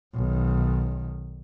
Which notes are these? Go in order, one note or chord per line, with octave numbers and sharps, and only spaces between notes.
B1 D#3